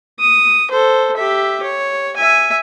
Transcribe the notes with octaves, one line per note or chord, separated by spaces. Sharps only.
D#6
A4 C5
G4 E5
C#5
E5 G#5